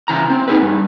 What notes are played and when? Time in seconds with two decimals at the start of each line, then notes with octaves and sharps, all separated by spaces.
0.08 C#3 E3 A#5
0.30 C4
0.48 D#4 G#4 B4
0.62 G2